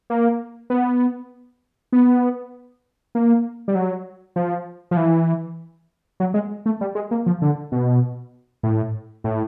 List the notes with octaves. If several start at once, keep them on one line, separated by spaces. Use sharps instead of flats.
A#3
B3
B3
A#3
G3
F#3
F3
F3
E3
F#3
G#3
A3
G3
G#3
A#3
F3
D3
B2
A2
A2